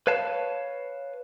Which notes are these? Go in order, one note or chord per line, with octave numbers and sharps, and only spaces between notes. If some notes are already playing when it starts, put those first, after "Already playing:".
B4 C#5 F5 A5